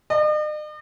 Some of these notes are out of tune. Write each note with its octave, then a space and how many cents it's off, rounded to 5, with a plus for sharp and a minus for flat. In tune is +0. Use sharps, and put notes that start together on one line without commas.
D#5 -45